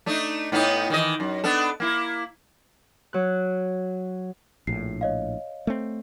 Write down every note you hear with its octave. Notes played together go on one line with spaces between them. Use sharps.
A3 D4 D#4
A2 B3 D#4
D#3 E3 D#5
F#2
B3 D4 A4
A#3 E4
F#3 F#6
A#1 A2 C7
C#5 D#5 F5
A3 C4